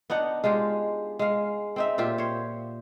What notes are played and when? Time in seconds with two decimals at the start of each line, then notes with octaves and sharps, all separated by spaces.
0.10 B3 D4 D#4 F#5
0.44 G#3 F4 G4 F5
1.19 G#3 F5
1.76 C4 D#4 E5
1.98 A#2 F4 G4 E5
2.18 C5 C#5